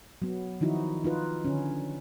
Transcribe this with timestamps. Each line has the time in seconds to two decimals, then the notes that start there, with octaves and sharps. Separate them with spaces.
0.22 F#3 B3
0.61 D#3 F3 D#4 E4 F#4
1.04 D#4 F4 B4
1.45 D3 C#4